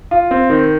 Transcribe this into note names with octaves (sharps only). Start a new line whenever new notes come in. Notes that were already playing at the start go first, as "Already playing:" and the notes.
F4
C4
D#3